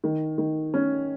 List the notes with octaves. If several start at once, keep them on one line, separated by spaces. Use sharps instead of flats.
D#3
D#3
C#4